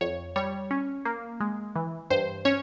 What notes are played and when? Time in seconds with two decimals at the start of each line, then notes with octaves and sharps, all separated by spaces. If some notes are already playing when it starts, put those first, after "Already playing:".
0.01 F2 C#5
0.36 G3 C#5
0.71 C#4
1.05 A#3
1.40 G#3
1.75 E3
2.10 G2 C5
2.45 C#4 C#5